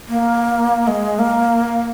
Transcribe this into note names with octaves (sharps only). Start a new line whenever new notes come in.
A#3
G#3
A#3